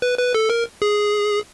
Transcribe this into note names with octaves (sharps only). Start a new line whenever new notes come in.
B4
B4
A4
A#4
G#4